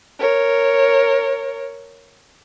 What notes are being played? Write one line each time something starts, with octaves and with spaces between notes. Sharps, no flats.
A#4 C#5